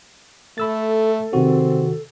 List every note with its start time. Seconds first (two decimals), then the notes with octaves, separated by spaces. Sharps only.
0.58 A3 A4 B5 E6 A6
1.33 C3 D#3 C4 F#4